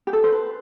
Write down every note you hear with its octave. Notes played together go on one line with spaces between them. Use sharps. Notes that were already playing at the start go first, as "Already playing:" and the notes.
G4
A4
C5
B4